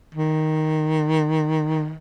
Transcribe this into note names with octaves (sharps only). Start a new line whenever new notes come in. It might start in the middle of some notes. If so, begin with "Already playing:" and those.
D#3